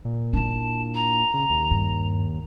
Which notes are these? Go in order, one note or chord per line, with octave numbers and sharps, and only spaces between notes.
A#2
D4 E4 A5
A#5
C#3
D#2
G2